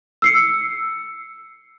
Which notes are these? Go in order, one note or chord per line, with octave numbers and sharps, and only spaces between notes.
E6 C7 C#7